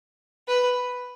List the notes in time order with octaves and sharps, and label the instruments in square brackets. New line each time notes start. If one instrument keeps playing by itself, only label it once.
[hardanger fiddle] B4